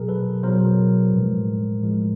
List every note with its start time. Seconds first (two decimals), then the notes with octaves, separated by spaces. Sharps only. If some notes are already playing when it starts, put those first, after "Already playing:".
Already playing: B2 F#3 G#4 A#4
0.08 A4 B4
0.43 B2 F#3 A#4 C5
1.13 A2 F3 G#3
1.83 A2 F3 G#3